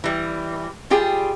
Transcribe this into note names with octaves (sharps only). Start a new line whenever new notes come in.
E3 G3
G3 F4 G4 G#4